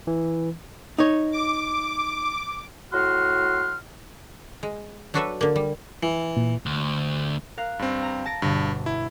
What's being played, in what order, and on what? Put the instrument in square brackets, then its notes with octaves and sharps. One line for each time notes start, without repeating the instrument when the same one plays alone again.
[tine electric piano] E3
[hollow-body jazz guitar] D#4 C#5
[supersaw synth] D6
[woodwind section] A2 F#4 F#5 C6 F6
[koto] G#3
F#3 D4 F#4 A4 B4 E5
D3 A#3
G3
[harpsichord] E3
[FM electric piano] A#2
[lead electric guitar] D2
[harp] A#4 F5 F#6
[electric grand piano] G2 C4
[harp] A#5
A5 A#6 D7
[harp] G1 B2 [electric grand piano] G2
[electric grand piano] E4